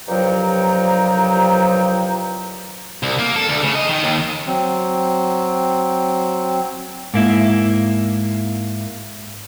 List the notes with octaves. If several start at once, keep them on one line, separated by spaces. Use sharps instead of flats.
C2 G2 F3 F#3 G5 A#5
C2
A#3
A4
D2
C#3
D#5
D#3
D#2
F#3 C4
G#2 A#3 E4